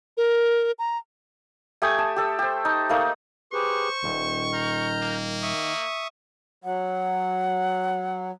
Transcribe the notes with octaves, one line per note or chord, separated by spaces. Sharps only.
A#4
A#5
A3 G4 G#5 D#6
A5
G4 A4 E5
G4 C5
D#4
A3 A#3 D#4
G4 G#4 B4 C5 C#6
D#1 D#3
A#5 F6 G6
A#3
E5 C#6 D#6
F#3 F#5